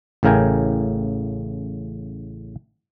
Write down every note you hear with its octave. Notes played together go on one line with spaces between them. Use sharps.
A1 A2 C#3 A#4 G5 G#5